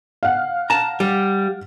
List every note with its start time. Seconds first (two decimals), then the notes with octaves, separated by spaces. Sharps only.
0.23 F5 F#5
0.70 A5 A#5
1.00 G3